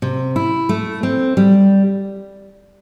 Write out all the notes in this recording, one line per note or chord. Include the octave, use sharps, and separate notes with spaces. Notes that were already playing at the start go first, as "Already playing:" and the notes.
C3
E4
A3
C4
G3